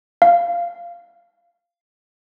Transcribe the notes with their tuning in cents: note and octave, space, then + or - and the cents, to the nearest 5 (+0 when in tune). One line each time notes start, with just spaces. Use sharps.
F5 -10